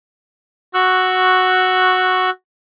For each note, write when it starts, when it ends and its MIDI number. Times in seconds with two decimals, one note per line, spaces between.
0.74 2.30 66
0.74 2.30 85
0.74 2.30 88
0.74 2.30 90